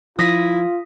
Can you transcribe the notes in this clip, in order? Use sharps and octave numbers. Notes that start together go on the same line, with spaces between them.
F3 E4 F4 D#6 A#6 B6